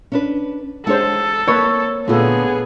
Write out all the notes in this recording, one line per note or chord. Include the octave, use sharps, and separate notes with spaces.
C#4 D4 B4
G#3 D4 G4 A4 C5 C#5 F#5
A#3 C4 B4 C#5
A#2 D3 A3 B3 D4 F4 G#4 A4